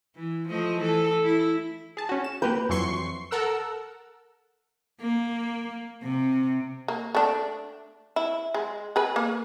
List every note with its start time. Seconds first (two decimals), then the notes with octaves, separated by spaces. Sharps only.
0.16 E3
0.48 F3 A3 D#5
0.78 E3 A4
1.24 E4
1.97 G#4 A5
2.09 C#4 F#4
2.24 E7
2.42 A#3 G4 B4 G6
2.69 F2 E3 F#3 C6 C#6 C7
3.31 A4 A#4 F#5 E6
5.01 A#3
6.02 C3
6.88 A#3
7.15 A3 D4
8.16 E4
8.54 G#3
8.96 G#4 B4
9.16 A#3